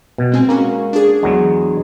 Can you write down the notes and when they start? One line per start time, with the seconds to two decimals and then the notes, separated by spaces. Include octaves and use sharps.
0.18 B2
0.32 G#3 C4 G#5
0.49 G#3 A#3 C#4 F#4
0.93 D4 G#4
1.23 E2 F#3 G#3